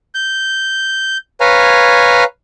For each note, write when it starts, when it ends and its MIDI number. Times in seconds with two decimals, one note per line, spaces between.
0.15 1.17 91
1.41 2.24 71
1.41 2.24 73
1.41 2.24 77
1.41 2.24 80
1.41 2.24 82